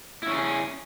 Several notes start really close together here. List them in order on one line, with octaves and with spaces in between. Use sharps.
E4 C#4 G#4